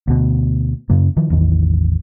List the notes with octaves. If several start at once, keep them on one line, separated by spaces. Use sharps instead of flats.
D2 B2
F#2 C#3 A#3
D#3 F3
A1 E2 D#3